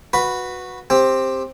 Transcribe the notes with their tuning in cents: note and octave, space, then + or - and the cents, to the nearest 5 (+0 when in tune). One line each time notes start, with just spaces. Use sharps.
F#4 -15 B4 +0 B5 +0
C4 +10 G4 +10